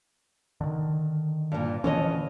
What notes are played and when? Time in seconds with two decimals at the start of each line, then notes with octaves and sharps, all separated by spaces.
0.61 D3 D#3
1.52 G2 A#2
1.84 F2 D3 E3 C#4 C#5 D#5